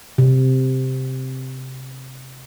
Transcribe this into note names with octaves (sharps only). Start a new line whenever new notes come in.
C3